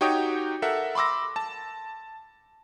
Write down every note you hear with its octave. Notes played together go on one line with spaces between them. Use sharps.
D#4 F#4 G4 C#5 G5 D#6
A4 A#4 E5 F#5
B5 C6 D6 E6 A#6
A5